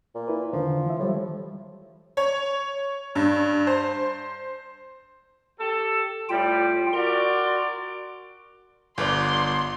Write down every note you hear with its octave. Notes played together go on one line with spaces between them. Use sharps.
A#2
E4 B4
E2 D3 D#3 F3
E3 E5
A2 F#3 G3
C#5
G2
C5
G4 A4
A2 G3 F4 G5
F#4 A#4 D5 C6
G1 F4 B4 D5 C6